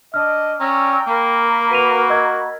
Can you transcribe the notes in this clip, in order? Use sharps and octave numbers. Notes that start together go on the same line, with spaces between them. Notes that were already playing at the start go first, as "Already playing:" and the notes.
D4 D#5 F6
C#4 D5 G5 A#5 E6
A#3 A#4 B5
F#4 B4 D#7 F7
D#5 E6 G#6